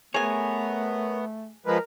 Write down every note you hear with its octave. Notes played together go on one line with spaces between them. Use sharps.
A3 B3 G#4 A#4 C#5 G#5
F3 G#3 A#4 B4